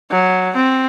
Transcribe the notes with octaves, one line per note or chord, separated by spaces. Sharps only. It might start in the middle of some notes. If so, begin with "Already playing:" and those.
F#3
C4